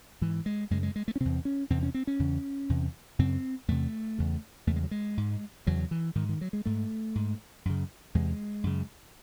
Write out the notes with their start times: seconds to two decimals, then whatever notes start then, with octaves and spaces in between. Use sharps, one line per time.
0.21 G#2 E3
0.46 G#3
0.70 F#2 C#3 G#3
0.83 G#3
0.96 G#3
1.08 A3
1.16 C#4
1.20 E2 C3 C4
1.45 C#4
1.70 E2 C3 C4
1.83 C#4
1.94 C4
2.07 C#4
2.19 E2 C#3
2.69 E2 C3
3.19 F#2 C#3 C4
3.68 E2 C3 A3
4.18 E2 C#3
4.67 E2 C#3 A3
4.76 G#3
4.83 F#3
4.91 G#3
5.17 G#2
5.67 E2 C#3 F#3
5.91 E3
6.15 G#2 D#3
6.29 D#3
6.41 F#3
6.53 G#3
6.66 G#2 A3
7.15 G#2
7.65 F#2 C#3
8.15 E2 C3 G#3
8.64 F#2 C#3